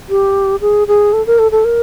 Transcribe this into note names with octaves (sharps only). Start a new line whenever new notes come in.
G4
G#4
G#4
A4
A#4
A4
A4
A#4